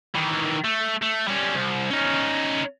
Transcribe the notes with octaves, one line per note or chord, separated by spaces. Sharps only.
D#3 E3
A3
A3
G3 C#4
C2
C#4 D#4